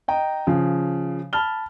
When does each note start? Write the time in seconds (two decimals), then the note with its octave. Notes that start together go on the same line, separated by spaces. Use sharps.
0.08 D#5 G5 A#5
0.47 C#3 F3
1.33 A5 B5 F6 G7